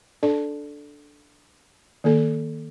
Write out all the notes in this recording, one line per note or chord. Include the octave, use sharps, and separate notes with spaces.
D4 A4 D5 A5
D#3 A#3 A4